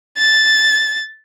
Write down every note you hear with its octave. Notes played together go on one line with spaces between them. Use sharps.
A6